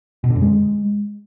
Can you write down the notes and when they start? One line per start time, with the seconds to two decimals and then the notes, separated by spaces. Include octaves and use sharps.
0.24 B2
0.30 D3
0.35 F#2
0.41 G#3